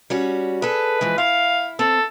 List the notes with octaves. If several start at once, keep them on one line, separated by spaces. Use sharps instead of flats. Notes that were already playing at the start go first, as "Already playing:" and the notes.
G3 C#4 F#4
G#4 A4 B4
E3 F3 G#3
E4 F5
C4 A4